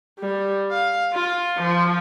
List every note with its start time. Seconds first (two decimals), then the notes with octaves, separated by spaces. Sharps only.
0.20 G3
0.71 F5
1.13 F4
1.58 F3